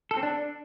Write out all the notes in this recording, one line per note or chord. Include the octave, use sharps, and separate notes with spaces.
A4
C4
D4